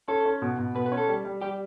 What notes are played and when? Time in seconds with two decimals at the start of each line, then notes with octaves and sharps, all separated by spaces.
0.08 C#4 A4
0.26 C#4
0.42 B2
0.58 B2
0.75 B2 B4
0.86 B4
0.92 C#4
0.97 A4
1.08 G3
1.25 G3
1.41 G3 G4